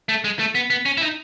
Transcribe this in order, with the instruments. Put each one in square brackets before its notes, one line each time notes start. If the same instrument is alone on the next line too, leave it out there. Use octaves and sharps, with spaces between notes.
[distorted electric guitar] A3
G#3
A3
B3
B3
C#4
E4
D#4